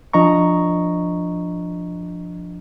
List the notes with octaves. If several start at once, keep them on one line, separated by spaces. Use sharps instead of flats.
F3 D4 D#5 A#5 C#6